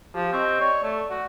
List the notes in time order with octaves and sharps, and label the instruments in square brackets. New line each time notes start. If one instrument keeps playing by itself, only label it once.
[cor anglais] F3 [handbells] G4
[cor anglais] C4 [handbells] D#5 C#6 G6
[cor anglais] C#5 [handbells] D5
[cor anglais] A3
F#4